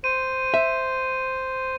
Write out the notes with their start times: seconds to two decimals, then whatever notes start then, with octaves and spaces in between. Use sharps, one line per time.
0.04 C5 D#7
0.54 E5